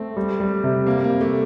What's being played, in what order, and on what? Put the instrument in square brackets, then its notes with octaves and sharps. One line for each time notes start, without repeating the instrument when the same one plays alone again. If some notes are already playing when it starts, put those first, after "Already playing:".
Already playing: [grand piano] A3 [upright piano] C4
[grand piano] G3
G3
C3
[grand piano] C3 [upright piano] A#3
[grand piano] G3 [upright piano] A#3
[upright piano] A3